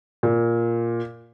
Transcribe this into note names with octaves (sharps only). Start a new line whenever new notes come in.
A#2